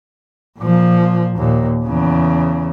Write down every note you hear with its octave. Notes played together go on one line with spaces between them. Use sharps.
A#2 F3
D#2 A#2
E2 C#3